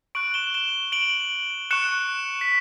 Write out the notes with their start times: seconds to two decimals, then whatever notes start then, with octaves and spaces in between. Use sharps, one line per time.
0.15 C#6 F#6 D7 F#7
0.34 E7 G7
0.54 E7 G7
0.92 D7 F#7
1.71 C#6 F#6 C#7 E7
2.41 B6